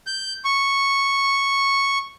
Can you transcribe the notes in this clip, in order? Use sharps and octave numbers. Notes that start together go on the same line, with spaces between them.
G6
C#6